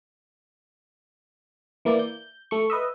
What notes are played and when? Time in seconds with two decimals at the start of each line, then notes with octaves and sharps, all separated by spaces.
1.85 E3 A#3 E4 D5
1.99 G6
2.51 A3 C#6
2.70 B4 D#5 E5